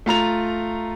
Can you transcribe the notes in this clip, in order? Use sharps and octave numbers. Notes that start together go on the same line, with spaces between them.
A3 F4 A#5 F7